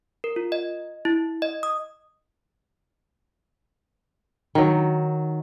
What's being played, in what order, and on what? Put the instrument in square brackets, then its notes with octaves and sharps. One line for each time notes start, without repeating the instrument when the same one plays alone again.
[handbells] A#4
F4
D#5
E4
D#5
D#6
[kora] D#3 F#3